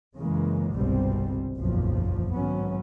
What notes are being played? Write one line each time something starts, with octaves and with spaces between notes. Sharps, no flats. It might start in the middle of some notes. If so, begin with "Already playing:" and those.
F#2 C#3 E3 G#3 A#3
G1 C2 B2 G3 G#3 C4
F#1 B1 E2 A#2 F3
G#1 G#2 F#3 B3 C#4